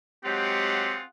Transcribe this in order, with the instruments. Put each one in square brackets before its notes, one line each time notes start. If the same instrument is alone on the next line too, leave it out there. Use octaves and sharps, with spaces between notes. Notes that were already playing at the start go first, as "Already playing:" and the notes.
[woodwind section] F#3 G#3 G4 [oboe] C4 [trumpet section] F4 G#4 F#5